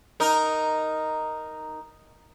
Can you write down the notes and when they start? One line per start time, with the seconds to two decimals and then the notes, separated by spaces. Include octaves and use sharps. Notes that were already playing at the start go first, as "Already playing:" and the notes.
0.20 D#4 A#4